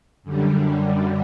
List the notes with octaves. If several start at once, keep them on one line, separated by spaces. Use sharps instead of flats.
F#2 D3 G3